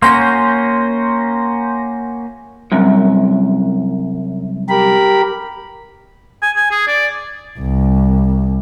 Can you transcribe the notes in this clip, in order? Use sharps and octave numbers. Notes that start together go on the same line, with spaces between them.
A#3 C#4 F#4 C6 G6 A#6
C2 F#2
G4 A#4 B5
G#5
G#5
G#4
D5
C2